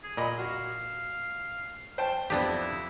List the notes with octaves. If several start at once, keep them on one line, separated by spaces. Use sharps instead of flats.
G#4
A#2 D#5 B5
F#4 F5
C5 G5 A5
F2 B3 D4 E4 G4